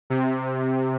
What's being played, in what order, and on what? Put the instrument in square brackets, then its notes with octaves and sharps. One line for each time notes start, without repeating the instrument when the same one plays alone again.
[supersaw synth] C3